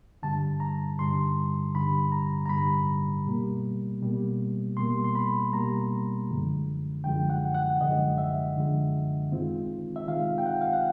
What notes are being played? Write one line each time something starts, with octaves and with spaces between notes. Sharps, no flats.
G2 D3 G3 A5
A#5
G2 D3 G3 C6
G2 D3 G3 B5
A#5
A#5
G2 D3 G3 B5
B2 G3 A#3
B2 G3 A#3
B2 G3 A#3 C6
C6
B5
B2 G3 A#3 A#5
F#2 D3 F3 G#3
F#2 D3 F3 G#3 G5
F#5
F#5
F#2 D3 F3 G#3 D#5
E5
F#2 D3 F3 G#3
D#3 G#3 C4 F4
E5
D#3 G#3 C4 F4 F5
G5
F#5
F5
F#5